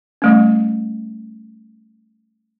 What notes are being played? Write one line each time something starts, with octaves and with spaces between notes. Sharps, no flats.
G3 A3 C#4